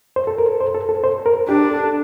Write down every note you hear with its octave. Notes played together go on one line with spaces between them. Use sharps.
C5
A4
A#4
C5
A4
A4
C5
A#4
D4 G4
A4